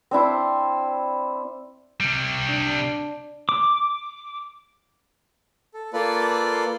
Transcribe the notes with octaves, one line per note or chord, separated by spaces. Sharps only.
C4 D4 E4 C5
C3 G3
D4
D6
A4
A#3 F4 A4 B4 D5